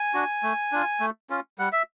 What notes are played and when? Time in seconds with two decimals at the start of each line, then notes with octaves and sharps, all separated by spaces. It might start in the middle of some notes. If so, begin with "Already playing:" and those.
Already playing: G#5
0.14 D4 F#4
0.43 A3
0.72 D4 F4
1.00 A3
1.30 C#4 F4
1.59 G3 F#5
1.72 E5